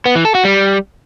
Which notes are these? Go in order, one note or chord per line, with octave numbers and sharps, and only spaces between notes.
B3
E3
A4
F#4
G3